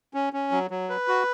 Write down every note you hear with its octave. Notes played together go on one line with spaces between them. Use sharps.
C#4
C#4
F#3
F#3
B4
F#4